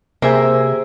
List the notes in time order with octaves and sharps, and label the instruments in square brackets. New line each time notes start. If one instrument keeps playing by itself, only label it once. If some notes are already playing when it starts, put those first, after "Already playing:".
[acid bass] C3 [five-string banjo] A#3 [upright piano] G#4 A#4 A#5 [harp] C5 E5 G#5